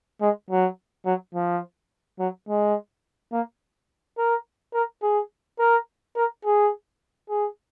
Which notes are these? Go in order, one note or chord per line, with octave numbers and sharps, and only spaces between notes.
G#3
F#3
F#3
F3
F#3
G#3
A#3
A#4
A#4
G#4
A#4
A#4
G#4
G#4